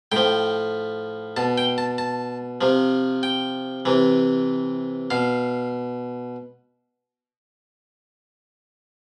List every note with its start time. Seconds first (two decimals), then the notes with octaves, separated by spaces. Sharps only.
0.12 A2 F3 G5
1.37 B2 A5
1.58 G5
1.78 A5
1.98 A5
2.61 C3 F3
3.23 G5
3.85 C3 E3
5.10 B2 F5